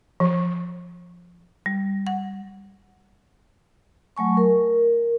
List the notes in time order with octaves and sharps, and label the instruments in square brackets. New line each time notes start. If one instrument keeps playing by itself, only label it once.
[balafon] F3
[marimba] G3
F#5
[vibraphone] F#3 A3 G#5 C#6
A#4